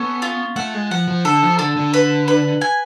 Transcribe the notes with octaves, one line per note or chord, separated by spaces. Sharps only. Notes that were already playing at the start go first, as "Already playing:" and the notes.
Already playing: B3 C#4 A4
F4
A3 F#5
G#3
F3 F#5
F3
D3 A4
F3
D3 A4
D3
B4
B4
G#5